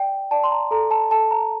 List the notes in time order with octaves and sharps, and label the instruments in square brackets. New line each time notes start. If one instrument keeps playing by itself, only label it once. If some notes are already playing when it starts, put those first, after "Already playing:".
Already playing: [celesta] D5 G5
D5 A5
C6
A#5
A4 A#5
A5
A4 A5
A#5